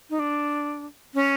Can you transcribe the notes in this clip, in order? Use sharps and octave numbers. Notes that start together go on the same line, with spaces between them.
D#4
D4
C#4